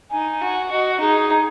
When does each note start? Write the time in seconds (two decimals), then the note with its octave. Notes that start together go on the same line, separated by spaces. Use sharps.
0.11 D#4 G#5
0.41 F#4
0.70 F#4 D#5
1.00 D#4 G#4